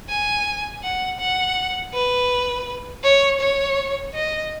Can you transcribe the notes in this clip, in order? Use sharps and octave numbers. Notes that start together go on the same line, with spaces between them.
G#5
F#5
F#5
B4
C#5
C#5
D#5